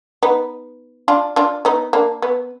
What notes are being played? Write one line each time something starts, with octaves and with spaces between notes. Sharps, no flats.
B3 D#4
D4 F4
D4 F4
B3 D#4
A#3 D4
B3